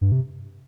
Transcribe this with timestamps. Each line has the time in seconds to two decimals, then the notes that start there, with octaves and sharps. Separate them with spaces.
0.01 G2
0.12 C3